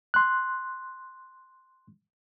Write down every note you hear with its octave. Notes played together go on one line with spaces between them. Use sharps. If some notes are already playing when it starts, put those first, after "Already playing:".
C6 F#6